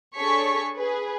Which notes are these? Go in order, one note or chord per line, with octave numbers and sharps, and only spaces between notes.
D4 G#4 A4 C#5 C#6 B6
G#4 B4